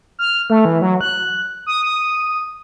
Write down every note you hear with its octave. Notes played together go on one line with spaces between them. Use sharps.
F6
A3
E3
F#3
F#6
D#6
D#6